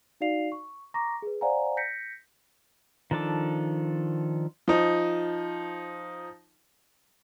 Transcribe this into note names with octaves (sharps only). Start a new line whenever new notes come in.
D#4 F#4 D5 F5 C7 F7
C#6
A#5 C#6 D6 A#6
G#4 B4
C5 D5 F5 F#5 G#5 A#5
G6 A#6 B6 C#7
D#3 F3 D4 A4 D6
F3 D#4